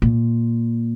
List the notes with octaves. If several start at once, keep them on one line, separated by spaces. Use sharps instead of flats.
A#2